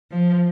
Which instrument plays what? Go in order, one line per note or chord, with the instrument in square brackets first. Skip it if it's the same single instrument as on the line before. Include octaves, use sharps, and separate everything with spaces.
[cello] F3